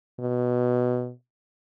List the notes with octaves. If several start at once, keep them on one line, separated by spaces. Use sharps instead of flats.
B2